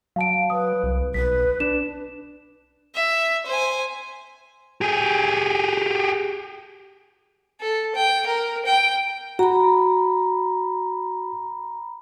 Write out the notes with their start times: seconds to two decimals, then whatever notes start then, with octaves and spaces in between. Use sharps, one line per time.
0.16 F#3 F5 A5 D7
0.50 B4 D#6
0.83 C2
1.14 B1 B4 B6
1.60 D4 E7
2.95 E5
3.46 C5 G#5
4.81 G4 G#4
7.60 A4
7.95 G5
8.26 A#4
8.66 G5
9.39 F#4 A#5 B5